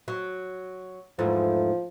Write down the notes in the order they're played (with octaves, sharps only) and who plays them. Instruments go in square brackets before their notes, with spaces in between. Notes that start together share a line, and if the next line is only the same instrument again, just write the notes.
[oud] F#3
[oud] E2 G#2 A3 [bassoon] F3